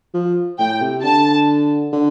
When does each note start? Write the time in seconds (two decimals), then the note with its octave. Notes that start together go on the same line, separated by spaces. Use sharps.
0.14 F3
0.58 A2 G5
0.81 C3
1.03 D3 A5
1.92 D3